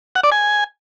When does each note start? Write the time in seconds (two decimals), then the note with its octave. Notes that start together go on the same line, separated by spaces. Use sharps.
0.15 F#5
0.24 D5
0.32 G#5